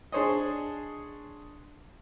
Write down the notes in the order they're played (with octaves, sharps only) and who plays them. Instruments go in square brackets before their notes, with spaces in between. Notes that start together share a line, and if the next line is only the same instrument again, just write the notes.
[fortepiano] D4 G#4 C5 C#5 D#5